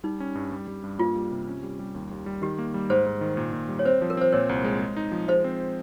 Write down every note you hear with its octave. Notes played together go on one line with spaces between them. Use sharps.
G3 D#4
C#4
G2
G3
G3
G2
A#3 F4
G3
C3
C#4
G3
G3
D#2
D#2
G3
D#3 G4
A#3
G3
G#2 C5
G#2
D#3
A#2
A#2
G3
C#5
C4 C5
F3
A#4
C4 C5
A#2 A#4 C#5
C2
G#3
G#3
D#4
F3
G#3 C5 D#5
C4